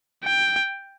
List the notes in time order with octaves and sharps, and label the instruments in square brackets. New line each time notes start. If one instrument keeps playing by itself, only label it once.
[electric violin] G5